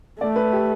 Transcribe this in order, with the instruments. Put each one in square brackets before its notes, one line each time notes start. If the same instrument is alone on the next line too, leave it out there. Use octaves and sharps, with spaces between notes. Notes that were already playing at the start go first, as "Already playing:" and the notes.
[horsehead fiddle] A3 [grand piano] D5
[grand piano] B4
G4